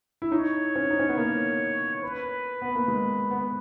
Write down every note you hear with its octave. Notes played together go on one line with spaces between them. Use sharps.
E4
D#4 C#5
C#4
D#4
C#4
B3
A#3
B4
B3
A#3
G#3
B3